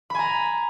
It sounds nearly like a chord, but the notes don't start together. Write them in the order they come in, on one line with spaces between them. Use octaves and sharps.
B5 G#5 A#5